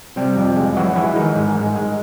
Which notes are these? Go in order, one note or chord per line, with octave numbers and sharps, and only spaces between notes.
C3 G3 G4
F2
G#3
E3 F#3 F#4
E3 G#3 E4
D#3 G#3 D#4
G#2
G#2
G#3